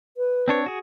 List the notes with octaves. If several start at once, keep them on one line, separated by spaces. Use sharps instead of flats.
B4
C4 D4 C#5
F#4 G#4